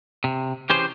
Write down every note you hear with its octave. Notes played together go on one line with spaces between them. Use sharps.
C3
E3 C#4 G4 G#4 C5